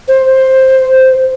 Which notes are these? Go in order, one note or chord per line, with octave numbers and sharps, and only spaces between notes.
C5